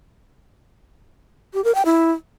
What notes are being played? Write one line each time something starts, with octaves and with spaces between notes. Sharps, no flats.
G4
A#4
G5
E4